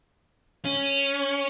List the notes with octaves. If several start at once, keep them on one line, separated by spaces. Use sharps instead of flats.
C#4